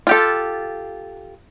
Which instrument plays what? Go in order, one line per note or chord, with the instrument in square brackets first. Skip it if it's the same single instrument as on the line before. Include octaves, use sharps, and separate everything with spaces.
[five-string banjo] F4 G4 A4